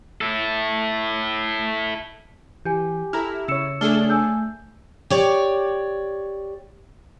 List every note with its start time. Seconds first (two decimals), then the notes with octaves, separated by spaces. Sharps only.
0.21 E4 A4
2.65 E3 G4 G#5 G6
3.13 E4 A4 A#5 F6
3.48 C#3 C#5 E6 C#7 E7
3.81 A3 D4 G#4 A4 F6 G7
4.10 G#5 E6 G6
5.10 G4 C#5 D5